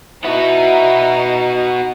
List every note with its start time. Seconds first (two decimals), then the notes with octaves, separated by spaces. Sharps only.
0.24 B3 D#4 E4 F#4